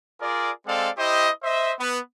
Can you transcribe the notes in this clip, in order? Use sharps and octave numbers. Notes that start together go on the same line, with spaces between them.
F4 G#4 A#4 D5
G#3 C4 A4 D5 F5
E4 G4 C5 D#5
C5 D#5 E5
B3 B4